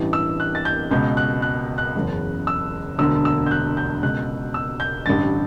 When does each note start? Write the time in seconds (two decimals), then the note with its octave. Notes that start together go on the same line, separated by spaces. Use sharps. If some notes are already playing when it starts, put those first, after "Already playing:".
Already playing: A1 G2 E3
0.13 E6
0.40 F#6
0.55 A6
0.65 G6
0.91 C#2 B2 G6
1.17 F#6
1.42 F#6
1.78 F#6
1.95 F#1 E2 C#3
2.47 E6
2.98 E1 D2 D3 E6
3.25 E6
3.46 G6
3.51 F#6
3.77 G6
4.02 C#2 B2 F#6
4.54 E6
4.80 G6
5.06 A1 G2 D3 A6